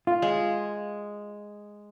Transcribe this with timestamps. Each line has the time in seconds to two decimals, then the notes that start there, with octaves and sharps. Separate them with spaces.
0.07 F4
0.22 G#3